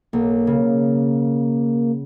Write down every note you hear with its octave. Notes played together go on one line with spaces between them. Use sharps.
B1 A#3
C#3